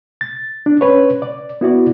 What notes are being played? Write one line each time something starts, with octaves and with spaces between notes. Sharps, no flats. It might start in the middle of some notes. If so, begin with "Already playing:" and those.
A6
D4
C#4 B4 C#5
D5
B3 E4 F#4 D5